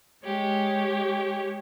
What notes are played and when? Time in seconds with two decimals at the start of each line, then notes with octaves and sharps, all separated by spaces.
0.23 G#3 G4 C#5